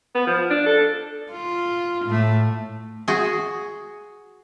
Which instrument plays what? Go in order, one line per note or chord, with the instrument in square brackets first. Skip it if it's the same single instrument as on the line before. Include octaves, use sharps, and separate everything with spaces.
[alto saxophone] B3
F3
D4
A4
[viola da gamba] F4
A2 A3
[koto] F#4 G#4